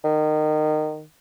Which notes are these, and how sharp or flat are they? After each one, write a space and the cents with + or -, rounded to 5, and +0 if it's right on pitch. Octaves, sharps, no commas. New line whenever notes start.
D#3 -20